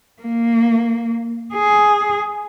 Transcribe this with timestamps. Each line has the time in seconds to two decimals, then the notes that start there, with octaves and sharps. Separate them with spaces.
0.22 A#3
1.54 G#4